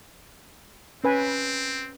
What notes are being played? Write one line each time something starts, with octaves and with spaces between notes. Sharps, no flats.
C4 C#4 B4 G#5